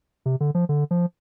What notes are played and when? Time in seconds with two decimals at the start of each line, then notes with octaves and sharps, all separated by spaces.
0.26 C3
0.40 D3
0.55 F3
0.69 D3
0.91 F3